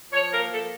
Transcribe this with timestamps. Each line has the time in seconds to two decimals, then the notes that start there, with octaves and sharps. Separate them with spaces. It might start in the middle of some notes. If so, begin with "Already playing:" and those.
0.12 F3 C#5
0.31 A#3 A#4
0.50 F3 A4